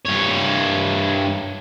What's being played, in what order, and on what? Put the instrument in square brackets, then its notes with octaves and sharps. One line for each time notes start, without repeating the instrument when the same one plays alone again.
[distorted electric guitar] G2 C#5